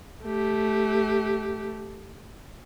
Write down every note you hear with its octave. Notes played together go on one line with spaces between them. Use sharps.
A3 G4